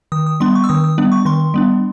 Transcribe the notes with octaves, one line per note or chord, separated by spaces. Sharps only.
D#3 D#6
D#6
G3 B3 D4 C6
C#6
E6
D#3 D#6
D#6
G3 B3 D4
C#6
D#3 C6
G3 B3 D4